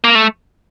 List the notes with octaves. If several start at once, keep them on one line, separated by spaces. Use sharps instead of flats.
A#3
A3